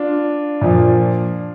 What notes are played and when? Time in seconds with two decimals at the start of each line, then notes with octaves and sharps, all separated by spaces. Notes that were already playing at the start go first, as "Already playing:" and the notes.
Already playing: D4 F4
0.61 A#2 F3